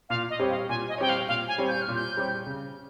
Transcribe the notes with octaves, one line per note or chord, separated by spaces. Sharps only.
A#2 F5
D#5
G3 C4 G4 C#5
F5
A#2 G#5
D#5
G3 C4 G4 C#5 G5
F5
A#2 F5
G#5
G3 C4 G4 C#5
G6
F6
A#2
G6
G3 C4 G4 C#5
C#3